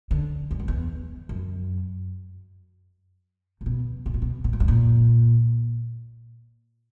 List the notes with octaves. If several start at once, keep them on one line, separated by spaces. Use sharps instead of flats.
D3
E2
F#2
E2
F#2
A#2
B2
B2
A#2
B2
B2
A#2
G2
A#2